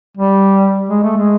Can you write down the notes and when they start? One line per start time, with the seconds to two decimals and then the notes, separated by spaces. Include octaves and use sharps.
0.17 G3
0.89 G#3
1.03 A3
1.17 G#3